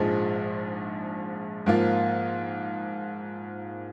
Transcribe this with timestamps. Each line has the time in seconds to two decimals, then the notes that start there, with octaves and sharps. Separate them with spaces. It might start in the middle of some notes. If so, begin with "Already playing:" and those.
Already playing: A#1 G#2 F3 G#3
1.66 G#2 F3 A#3 F4